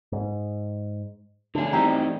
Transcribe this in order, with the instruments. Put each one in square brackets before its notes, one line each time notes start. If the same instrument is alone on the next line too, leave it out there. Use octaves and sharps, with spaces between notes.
[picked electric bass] G#2
[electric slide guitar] D3 G#4 [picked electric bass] A3 D4
[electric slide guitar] E3 C4 D#4 [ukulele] E4 G4 A#5